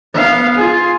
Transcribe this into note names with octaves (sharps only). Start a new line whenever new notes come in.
B3 F5
F4 G#4